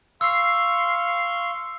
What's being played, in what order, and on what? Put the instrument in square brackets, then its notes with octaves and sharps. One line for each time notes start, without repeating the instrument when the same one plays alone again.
[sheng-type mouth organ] F5 C6 C#6 [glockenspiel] E6 C7